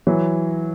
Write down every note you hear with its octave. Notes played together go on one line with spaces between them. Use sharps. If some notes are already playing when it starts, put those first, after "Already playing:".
E3 F#3